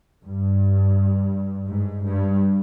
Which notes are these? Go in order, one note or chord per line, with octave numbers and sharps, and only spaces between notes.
G2
G#2
G2